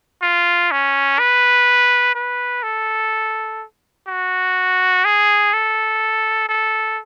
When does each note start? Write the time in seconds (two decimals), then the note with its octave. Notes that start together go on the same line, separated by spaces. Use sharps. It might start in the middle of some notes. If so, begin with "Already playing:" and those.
0.22 F4
0.71 C#4
1.19 B4
2.15 B4
2.63 A4
4.08 F#4
5.05 G#4
5.53 A4
6.49 A4